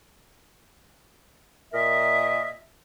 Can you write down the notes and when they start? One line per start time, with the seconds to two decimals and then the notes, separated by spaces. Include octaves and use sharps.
1.72 A#2 A#4 D#5 E5